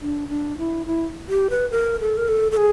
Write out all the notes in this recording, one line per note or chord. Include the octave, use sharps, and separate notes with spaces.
D4
D4
E4
E4
G4
B4
A#4
A4
A#4
A4
A4
G#4